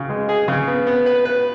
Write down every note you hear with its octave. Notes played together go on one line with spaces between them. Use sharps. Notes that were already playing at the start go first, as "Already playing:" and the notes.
Already playing: C#3
G#3
G#4
C#3
B3
B3
B4
B4